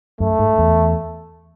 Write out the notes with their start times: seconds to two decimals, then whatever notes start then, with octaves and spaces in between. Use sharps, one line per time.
0.20 F#2 A3
0.39 G#2
0.58 E2